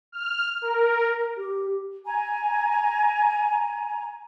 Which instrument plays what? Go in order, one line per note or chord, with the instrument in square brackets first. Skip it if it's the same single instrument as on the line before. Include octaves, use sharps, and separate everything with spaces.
[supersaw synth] F6
A#4
[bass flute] G4
[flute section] G#5 A#5